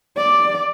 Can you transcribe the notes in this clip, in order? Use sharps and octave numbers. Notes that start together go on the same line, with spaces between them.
D5